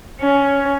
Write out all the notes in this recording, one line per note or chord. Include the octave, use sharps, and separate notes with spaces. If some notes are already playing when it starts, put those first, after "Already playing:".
C#4